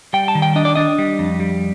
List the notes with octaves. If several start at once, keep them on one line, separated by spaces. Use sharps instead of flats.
G3 G5
A5
D#3
G5
D4 D#5
D5
D4 D#5
G3
F2
G3